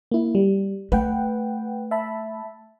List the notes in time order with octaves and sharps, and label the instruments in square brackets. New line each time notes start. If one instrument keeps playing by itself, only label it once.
[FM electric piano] A#3 E4
G3
[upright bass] A3 [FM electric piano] B4 F#5 G5
[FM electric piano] E5 A5 B5